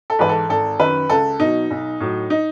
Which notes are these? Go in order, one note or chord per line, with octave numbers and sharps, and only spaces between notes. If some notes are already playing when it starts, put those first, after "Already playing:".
A4
G#2 E3 B4
A4
G#1 A4
F#2 D#3 B4
C#2 A4
B2 F#3 D#4
B1
A2 F#3
D#4